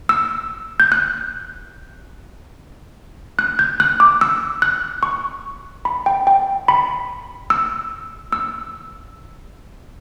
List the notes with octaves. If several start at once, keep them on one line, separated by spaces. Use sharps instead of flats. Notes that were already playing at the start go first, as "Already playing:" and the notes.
E6
G6
F#6
F#6
G6
F#6
D6
E6
F#6
C#6
B5
G5
G5
B5
E6
E6